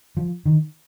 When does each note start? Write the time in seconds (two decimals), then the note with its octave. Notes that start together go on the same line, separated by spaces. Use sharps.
0.17 F3
0.46 D#3